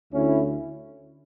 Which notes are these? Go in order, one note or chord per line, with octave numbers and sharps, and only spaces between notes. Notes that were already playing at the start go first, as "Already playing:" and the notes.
D2 D3 C#4 E4